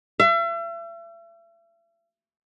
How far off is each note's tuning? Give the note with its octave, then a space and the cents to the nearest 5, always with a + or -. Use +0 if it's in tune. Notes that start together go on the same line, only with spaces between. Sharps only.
E5 +40